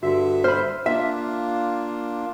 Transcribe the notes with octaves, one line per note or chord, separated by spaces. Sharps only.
G2 D3 F#4 E5
C5 B5 F6
A#3 D4 F4 E5